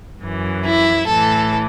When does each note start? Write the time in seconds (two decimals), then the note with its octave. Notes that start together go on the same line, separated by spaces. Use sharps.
0.22 F#2 E3
0.65 E4
1.07 A2 E3 A4